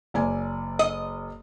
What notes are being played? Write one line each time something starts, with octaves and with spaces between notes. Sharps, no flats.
F#1 D5 G#5
D#5